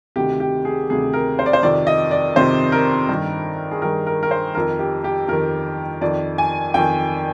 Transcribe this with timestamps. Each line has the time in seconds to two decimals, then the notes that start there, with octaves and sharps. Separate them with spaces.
0.16 D2 C3 D#3 G4
0.40 G4
0.65 G#4
0.89 D2 C3 D#3 G#4
1.13 A#4
1.39 C5
1.46 D5
1.53 C5
1.63 F2 C3 D#3 D5
1.87 D#5
2.11 D5
2.36 F2 C3 D#3 C5
2.72 A#4
3.09 G2 D#3
3.71 G#4
3.82 G2 D#3 A#4
4.07 A#4
4.23 A#4
4.31 C5
4.55 F2 D#3 A#4
4.79 G4
5.04 G4
5.28 F2 D#3 A#4
6.01 F2 D#3 D5
6.38 G#5
6.74 F2 D#3 G5